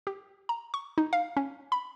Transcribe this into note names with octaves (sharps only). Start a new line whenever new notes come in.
G4
A#5
C#6
D#4
F5
C#4
B5